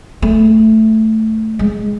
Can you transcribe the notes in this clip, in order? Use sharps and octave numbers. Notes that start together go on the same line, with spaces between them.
A3
G#3